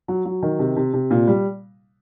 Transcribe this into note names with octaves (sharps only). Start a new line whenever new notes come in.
F#3
F#3
D#3
C3
C3
C3
A#2
G3